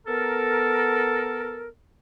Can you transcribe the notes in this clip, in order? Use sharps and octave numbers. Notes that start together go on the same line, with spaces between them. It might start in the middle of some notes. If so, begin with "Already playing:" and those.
B3 A4 A#4